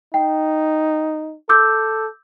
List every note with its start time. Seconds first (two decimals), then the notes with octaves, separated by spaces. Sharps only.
0.14 D#4 G5
1.49 A4 D6 E6 G6